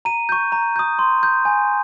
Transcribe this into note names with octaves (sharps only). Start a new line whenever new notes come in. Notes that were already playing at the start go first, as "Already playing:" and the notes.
A#5 D#7
C#6 G6
A#5
D#6 G6
C6
G6
G#5